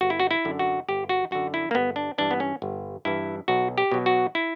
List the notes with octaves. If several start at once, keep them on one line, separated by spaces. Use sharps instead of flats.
G1 F#4
E4
F#4
E4
F#2 D3
F#4
G1 G4
F#4
F#2 D3 F#4
E4
A#3
G1 B3
D4
G2 E3 D4
B3
C#4
G1
G2 E3 E4
B1 F#4
G4
B2 F#3
F#4
E4